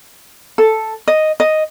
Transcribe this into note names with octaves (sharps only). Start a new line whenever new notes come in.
A4
D#5
D#5